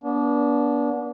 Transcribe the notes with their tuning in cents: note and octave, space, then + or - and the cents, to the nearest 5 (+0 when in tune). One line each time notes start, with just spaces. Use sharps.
B3 -40 D4 -25